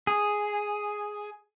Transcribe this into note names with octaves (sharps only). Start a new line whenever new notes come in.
G#4